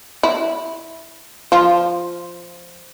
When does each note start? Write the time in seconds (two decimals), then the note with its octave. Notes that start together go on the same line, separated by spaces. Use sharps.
0.23 E4
1.52 F3